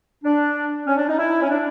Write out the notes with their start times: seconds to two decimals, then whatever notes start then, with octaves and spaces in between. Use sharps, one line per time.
0.24 D4
0.87 C#4
0.97 D4
1.08 D#4
1.18 E4
1.42 C#4
1.49 D4